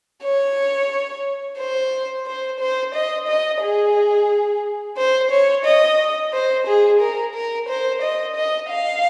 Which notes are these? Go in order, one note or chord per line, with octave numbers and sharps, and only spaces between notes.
C#5
C5
C5
C5
D#5
D#5
G#4
C5
C#5
D#5
C5
G#4
A#4
A#4
C5
D#5
D#5
F5